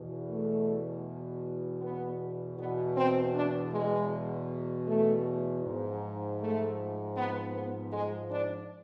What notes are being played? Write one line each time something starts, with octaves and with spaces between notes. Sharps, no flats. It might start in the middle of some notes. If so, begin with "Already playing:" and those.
Already playing: E2 B2
A3
B3
E2 B2 B3
C4
D4
G#3
A3
G#2 F3
A3
B3
B3
G#3
D4